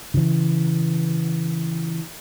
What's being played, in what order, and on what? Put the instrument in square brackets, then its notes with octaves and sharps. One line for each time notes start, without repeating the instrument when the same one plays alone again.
[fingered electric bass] C#3 E3